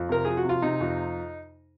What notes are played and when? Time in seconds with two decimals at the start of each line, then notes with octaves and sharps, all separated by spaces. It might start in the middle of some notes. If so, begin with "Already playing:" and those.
Already playing: F2
0.09 C3 A#4
0.25 F3 G#4
0.37 F#4
0.44 C3 F4
0.62 C3 D#4
0.80 F2